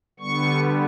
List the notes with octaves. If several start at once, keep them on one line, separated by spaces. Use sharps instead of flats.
D3 G3 B3 C#6